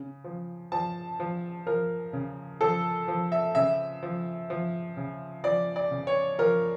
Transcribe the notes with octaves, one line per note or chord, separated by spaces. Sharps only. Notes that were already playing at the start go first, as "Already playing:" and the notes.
Already playing: C#3
F3
F3 A5
F3
F3 A#4
C#3
F3 A4
F3
E5
C#3 E5
F3
F3
C#3
F3 D5
D5
C#3
C#5
F3 A#4